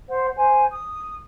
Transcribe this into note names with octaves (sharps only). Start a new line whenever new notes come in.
C5 F#5
C5 G#5
D#6